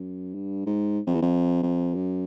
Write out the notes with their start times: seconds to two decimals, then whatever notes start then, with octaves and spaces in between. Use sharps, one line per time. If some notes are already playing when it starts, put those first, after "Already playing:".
Already playing: F#2
0.34 G2
0.66 G#2
1.07 F2
1.15 E2
1.22 F2
1.63 F2
1.95 F#2